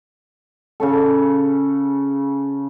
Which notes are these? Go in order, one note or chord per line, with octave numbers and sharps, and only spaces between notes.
C#3 C#4 A4